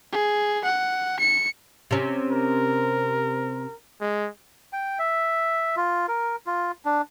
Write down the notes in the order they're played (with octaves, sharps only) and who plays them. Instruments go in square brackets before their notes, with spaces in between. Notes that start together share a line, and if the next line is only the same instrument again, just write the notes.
[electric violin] G#4
F#5
C#7
[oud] C3 C#4
[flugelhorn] A#4
G#3
[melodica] G5
E5
F4
A#4
F4
D4